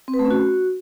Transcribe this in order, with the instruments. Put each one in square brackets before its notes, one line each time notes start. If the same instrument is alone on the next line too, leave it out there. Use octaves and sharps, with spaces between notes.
[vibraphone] C4
B4
A3
C#4
F#4